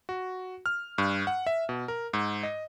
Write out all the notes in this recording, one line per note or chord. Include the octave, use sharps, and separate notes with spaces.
F#4
F6
G2
F#5
E5
B2
A#4
G#2
D#5